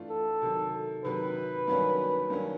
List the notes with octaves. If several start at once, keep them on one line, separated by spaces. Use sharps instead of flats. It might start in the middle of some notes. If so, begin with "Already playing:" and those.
Already playing: E3 A3 D4 F4
A4
C3 D#3 F#3
C3 D#3 F#3 B4
G2 D#3 F#3 A#3 C#4
G2 D#3 F#3 A#3 C#4